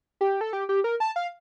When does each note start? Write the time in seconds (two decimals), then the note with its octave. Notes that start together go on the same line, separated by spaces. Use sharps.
0.21 G4
0.41 A4
0.53 G4
0.69 G4
0.84 A#4
1.00 A5
1.16 F5